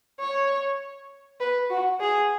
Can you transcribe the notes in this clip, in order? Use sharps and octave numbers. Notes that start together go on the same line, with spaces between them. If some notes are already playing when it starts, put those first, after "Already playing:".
C#5
B4
F#4
G#4